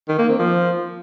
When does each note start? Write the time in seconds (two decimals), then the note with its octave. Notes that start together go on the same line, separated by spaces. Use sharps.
0.08 D#3
0.19 A#3
0.29 C4
0.39 F3